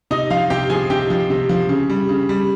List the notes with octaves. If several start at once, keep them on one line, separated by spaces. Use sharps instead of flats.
C3 D#4 D#5
F3 F4 F5
C3 G4 G5
F3 G#4 G#5
C3 G4 G5
F3
C3
F3
C#3
G3
C#3
G3